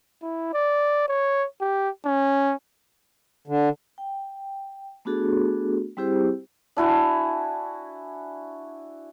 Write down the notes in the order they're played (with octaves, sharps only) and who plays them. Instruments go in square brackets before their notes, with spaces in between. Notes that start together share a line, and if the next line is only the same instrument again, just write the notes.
[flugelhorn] E4
D5
C#5
G4
C#4
[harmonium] D3
[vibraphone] G5
A3 B3 D4 F#4 G#4 A4
G3 C4 E4 G4 G#4 C5
[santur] D4 E4 F#4 G#5